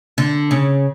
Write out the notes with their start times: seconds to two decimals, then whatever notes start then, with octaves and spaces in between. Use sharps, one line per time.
0.18 D3
0.51 C#3